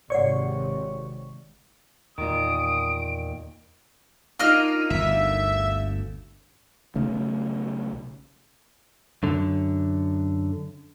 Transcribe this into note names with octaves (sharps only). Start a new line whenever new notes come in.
G#1 C3 C#5 D5 F#5 C#6
E2 A#2 D#3 D#6 D7
A#3 D4 D#4 F4 D#5 F6
G1 D2 E5 E7
B1 C#3 A3
F#2 D3